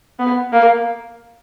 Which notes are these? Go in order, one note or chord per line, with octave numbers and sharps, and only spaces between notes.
B3
A#3